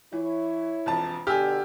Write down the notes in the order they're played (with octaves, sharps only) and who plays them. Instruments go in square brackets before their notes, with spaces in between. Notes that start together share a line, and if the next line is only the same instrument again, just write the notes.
[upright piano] E3 [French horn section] E4 C#5
[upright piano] E1 F2 A5
[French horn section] B2 D3 [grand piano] G4 [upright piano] G#5 E6 F6